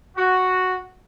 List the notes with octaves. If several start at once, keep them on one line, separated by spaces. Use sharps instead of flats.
F#4